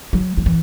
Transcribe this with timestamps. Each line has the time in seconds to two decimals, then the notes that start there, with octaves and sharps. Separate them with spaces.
0.13 F#3
0.37 F#3
0.46 E3